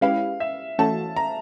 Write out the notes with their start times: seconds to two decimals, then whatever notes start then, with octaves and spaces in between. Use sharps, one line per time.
0.01 G#3 C#4 E4 G4 B4 F5
0.40 E5
0.79 E3 A3 C#4 F#4 A4 A5
1.16 A#5